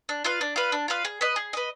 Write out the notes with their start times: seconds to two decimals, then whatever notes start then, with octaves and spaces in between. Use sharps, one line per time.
0.09 D4
0.24 F4 B4 F5
0.41 D4
0.56 F4 B4 F5
0.72 D4
0.88 F4 B4 F5
1.05 G#4
1.21 B4 D#5
1.36 G#4
1.53 B4 D#5